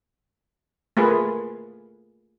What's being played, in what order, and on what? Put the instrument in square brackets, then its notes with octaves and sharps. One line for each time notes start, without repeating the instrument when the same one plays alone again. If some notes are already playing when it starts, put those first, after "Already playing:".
[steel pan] A3 A#3 F4 G#4 B4